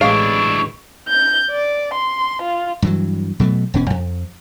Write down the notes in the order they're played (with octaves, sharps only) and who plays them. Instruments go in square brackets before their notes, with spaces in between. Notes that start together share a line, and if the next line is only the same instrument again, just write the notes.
[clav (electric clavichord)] A1 G#3 C#5 [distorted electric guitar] D4 E4 [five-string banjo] F5 [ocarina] C#6
[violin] G6
D5
C6
F4
[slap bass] G2 E3 F#3
B2 F#3 G#3 A3
E1 B2 C#4
F2